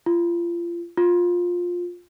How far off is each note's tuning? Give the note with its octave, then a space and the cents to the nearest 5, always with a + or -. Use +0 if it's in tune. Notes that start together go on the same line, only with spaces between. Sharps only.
F4 -30
F4 +15